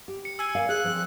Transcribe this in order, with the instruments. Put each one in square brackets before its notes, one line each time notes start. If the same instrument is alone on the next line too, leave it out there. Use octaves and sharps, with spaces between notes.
[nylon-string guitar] G4
[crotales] C#7
[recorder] G#5 [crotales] E6
[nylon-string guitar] A#4 D5 F5
[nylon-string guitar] G#4 [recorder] F#6
[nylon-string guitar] F3 C4